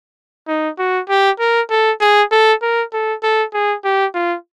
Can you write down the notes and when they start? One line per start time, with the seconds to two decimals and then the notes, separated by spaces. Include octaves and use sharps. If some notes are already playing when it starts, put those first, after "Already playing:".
0.48 D#4
0.79 F#4
1.09 G4
1.40 A#4
1.70 A4
2.01 G#4
2.32 A4
2.62 A#4
2.93 A4
3.23 A4
3.54 G#4
3.84 G4
4.14 F4